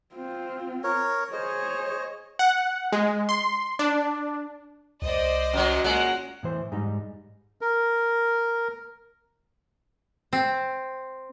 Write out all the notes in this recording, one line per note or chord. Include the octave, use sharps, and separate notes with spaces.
C4 F4
A#4 C#5
G#4 C5 C#5 D#5
F#5
G#3
C6
D4
C2 C5 D5 D#5
F#2 F#3
A#2 G#3 C#4 F#5 A#5
A2 E3 C5
G#2 G3 D#4
A#4
C4